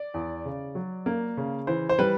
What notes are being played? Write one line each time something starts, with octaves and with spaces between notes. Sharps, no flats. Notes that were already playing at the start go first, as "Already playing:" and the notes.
Already playing: D5
E2
C#3
F#3
A#3
C#3
E3 C5
C5
G3 B4